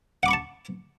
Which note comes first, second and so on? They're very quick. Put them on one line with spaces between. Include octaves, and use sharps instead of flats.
F#5 D6 B5 C#6 A5